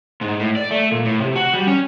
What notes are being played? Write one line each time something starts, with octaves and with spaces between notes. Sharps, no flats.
G#2
A2
D5
A3
A#2
A2
C3
F#4
G3
C#4